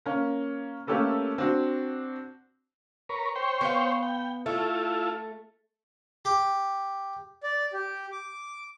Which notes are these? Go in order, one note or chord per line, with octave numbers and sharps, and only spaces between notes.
A#3 C#4
A3 A#3 C#4 G4 A4 B4
C4 D4 F#4
A#4 B4 C#5
C5 C#5 G5
B3 B4 F5
G5
A3 E4 F4 A4
G4
D5
G4
D6